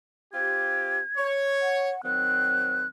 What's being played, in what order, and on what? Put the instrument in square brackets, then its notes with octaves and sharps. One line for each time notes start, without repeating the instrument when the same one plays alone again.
[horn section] C4 F4 G4 [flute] G#6
[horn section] C#5
[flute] F#5
[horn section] D#3 F#3 C4 [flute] F#6